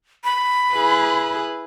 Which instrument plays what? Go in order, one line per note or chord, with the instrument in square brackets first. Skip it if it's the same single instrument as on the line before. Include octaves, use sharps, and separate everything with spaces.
[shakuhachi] B5
[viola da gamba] E4 G#4 B4